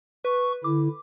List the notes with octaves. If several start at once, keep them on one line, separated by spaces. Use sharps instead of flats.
B4 C#6
D3 E4 D6